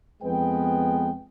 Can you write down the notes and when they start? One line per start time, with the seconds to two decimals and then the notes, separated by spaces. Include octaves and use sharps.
0.23 F2 G#3 B3 B4 G5